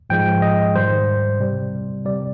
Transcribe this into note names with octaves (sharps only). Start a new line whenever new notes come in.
G#2 F3 G#3 G5
D#5
G#2 D#3 G3 C5
C3 G3
C3 G3 D5